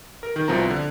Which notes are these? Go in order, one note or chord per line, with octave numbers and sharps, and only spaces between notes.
A#4
D#3
C2 B2 F3 C4 F#4 A#5
D3